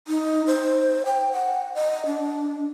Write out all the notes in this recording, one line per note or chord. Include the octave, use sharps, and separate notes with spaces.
D#4
C5
G5
F#5
D#5
D4